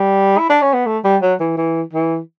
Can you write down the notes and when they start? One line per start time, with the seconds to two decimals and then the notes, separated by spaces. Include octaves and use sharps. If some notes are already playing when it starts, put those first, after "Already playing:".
Already playing: G3
0.38 E4
0.49 D4
0.62 C#4
0.74 B3
0.86 A3
1.04 G3
1.22 F#3
1.39 E3
1.57 E3
1.93 E3